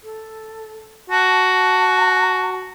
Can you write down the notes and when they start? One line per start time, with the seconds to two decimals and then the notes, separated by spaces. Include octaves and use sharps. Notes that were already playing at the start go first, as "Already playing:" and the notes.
0.04 A4
1.10 F#4 A5